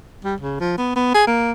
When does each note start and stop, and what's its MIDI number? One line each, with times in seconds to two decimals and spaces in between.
0.25 0.35 55
0.41 0.60 49
0.60 0.74 53
0.78 0.94 59
0.96 1.12 59
1.14 1.26 68
1.27 1.52 58